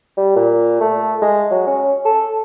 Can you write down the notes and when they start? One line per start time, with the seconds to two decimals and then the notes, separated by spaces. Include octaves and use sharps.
0.17 G3
0.36 A#2
0.81 A3
1.21 G#3
1.51 F#3
1.67 C#4
2.05 A4